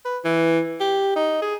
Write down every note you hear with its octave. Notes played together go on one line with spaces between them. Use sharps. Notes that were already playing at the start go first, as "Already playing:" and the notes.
B4
E3
G4
D#4
G#4